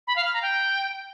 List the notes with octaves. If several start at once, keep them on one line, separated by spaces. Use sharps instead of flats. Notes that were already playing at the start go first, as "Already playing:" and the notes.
B5
F5
F6
A#5
G5